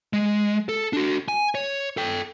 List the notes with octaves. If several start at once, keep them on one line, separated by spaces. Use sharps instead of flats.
G#3
A4
D4 F#4
G#5
C#5
A4 G5